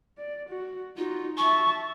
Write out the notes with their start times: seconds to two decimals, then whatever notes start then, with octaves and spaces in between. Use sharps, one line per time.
0.18 D5
0.49 F#4
0.97 D#4 F4 F#4
1.37 E5 A5 C#6